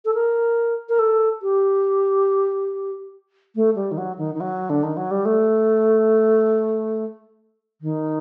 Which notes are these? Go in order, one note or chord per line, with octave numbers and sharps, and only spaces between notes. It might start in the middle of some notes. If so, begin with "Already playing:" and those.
A4
A#4
A#4
A4
G4
A3
G3
D#3
F#3
D#3
D#3
F#3
D3
D#3
F#3
G3
A3
D#3